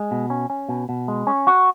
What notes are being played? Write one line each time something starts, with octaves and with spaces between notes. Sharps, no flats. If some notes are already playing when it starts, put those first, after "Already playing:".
Already playing: G#3
B2
C#4
C#4
B2
B2
G#3
C#4
F#4